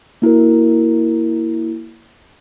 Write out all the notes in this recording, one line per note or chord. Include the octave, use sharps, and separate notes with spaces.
A#3 E4 F#4 A#4